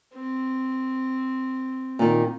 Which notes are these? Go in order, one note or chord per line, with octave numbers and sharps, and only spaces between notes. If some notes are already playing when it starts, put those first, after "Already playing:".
C4
A#2 D#3